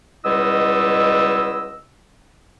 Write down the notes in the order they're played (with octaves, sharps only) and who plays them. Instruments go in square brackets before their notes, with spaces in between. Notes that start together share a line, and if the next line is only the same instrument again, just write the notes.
[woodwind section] C#2 B2 G3 E4 D#5 E6